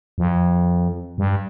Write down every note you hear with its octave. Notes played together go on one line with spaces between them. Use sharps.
F2
G2